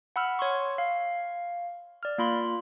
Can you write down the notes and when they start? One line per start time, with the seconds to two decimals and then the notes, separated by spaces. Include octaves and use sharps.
0.16 F#5 B5 E6 F6
0.39 C#5 C6 C#6
0.78 F5
2.03 D5 F6
2.18 A#3 F4 B5 C6